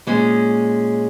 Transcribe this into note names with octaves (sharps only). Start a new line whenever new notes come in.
A#2 G#3 C#4